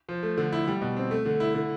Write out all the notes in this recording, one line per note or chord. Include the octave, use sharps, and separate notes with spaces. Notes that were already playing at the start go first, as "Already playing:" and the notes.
F3
A3
D3
E4
G3
B2
C4
A3
D3
E4
D3